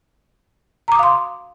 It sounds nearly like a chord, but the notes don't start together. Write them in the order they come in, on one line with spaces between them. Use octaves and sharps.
A#5 D6 D#6 F5 C6